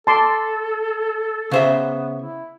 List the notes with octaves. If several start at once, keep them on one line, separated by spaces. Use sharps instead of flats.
A4 A5 C6 D6
C#3 B3 C5 E5
E4